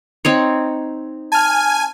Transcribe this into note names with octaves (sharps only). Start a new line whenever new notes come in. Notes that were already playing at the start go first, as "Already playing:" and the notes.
C4 D#4 C#5
G#5 A5 F6